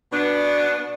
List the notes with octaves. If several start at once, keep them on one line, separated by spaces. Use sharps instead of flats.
B2 B3 D4